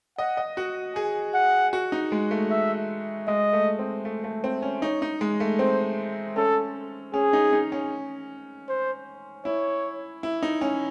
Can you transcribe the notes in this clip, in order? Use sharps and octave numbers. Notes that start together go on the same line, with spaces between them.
D#5 F#5
D#5
F#4
G#4 G#5
F#5
F#4
D#4
G#3
A3
E5
G#3 D#5
A3
C4
A3
A3
C4
C#4
D#4 C#5
D#4
G#3
A3
C4 C5
C#4 A4
C#4 G#4
D#4
D#4
C#4
C5
E4 C#5
E4
D#4
C#4